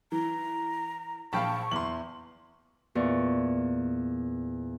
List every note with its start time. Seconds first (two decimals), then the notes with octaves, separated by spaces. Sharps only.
0.12 E3 A#5
1.33 A#1 F5 G5 A5 B5 C#6
1.71 E2 C6 F#7
2.95 E2 A#2 D5 C#6